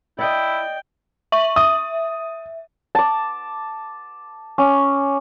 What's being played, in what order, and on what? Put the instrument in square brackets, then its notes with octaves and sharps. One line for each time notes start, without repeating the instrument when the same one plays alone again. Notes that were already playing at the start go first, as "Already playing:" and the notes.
[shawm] E4 [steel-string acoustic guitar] D5 D#5 [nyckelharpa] G5
[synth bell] E5 C#6 F#7
[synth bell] E5 [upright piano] D#6
[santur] A5 D6
C#4 D6